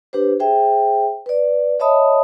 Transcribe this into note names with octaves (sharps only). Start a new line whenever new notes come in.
D4 G4 B4 C5
G#4 C5 E5 G5
B4 D5
C#5 D#5 E5 A5 B5 D#6